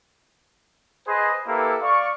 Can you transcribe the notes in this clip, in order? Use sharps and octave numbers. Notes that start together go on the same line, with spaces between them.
G#4 B4 C5 D#5 G#5
A#3 E4 G4 A4 B4
D5 F5 C#6